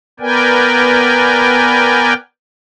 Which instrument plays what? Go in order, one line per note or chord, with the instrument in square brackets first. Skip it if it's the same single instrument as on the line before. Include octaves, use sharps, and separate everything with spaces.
[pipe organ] B3 A#4 B4 D5 G5 G#5